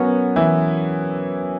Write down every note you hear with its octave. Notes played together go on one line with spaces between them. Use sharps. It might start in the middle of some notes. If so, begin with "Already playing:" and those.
Already playing: F#3 B3 C#4 F#4 A#4 C#5
E3 E4